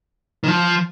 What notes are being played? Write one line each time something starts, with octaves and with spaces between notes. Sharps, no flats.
D#3
F3